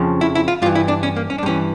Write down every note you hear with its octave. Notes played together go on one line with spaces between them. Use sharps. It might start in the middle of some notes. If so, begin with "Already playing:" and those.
Already playing: F2 C#3 F3
E4
E4
F4
G2 E3 F4
E4
D4
C#4
A#3
C#4
D4
G2 E3 C#4